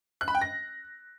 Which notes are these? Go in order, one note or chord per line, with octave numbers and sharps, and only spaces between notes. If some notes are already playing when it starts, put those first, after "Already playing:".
F#6
B5
G5
A#6